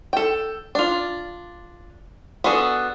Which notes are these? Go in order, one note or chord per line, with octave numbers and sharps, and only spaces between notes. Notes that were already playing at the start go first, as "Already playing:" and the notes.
A4 G5
D4 F4
B3 D4 F#4 G#4 A4